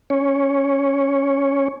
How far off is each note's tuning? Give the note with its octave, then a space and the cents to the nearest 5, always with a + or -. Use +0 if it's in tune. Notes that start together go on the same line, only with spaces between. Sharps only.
C#4 +0 C#5 +0